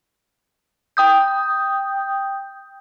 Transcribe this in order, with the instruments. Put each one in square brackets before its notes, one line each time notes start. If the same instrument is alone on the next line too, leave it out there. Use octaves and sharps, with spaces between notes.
[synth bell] G5 D#6 G6